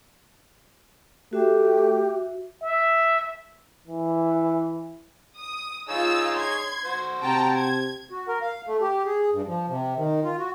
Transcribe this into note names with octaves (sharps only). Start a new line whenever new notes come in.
A3 F#4 G4 E5
E5
E3
D#6
D#4 F4 G#4 C#5 E6
C6 G#6
F#4 C5
C3 G5 A5 A#5
G#6
F#4
A#4
F5
A3
G4
G#4
G2
F3
C3
D#3
F4
F#4